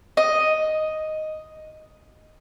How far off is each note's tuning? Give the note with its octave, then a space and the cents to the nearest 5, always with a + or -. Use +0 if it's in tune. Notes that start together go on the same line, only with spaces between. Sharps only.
D#5 +0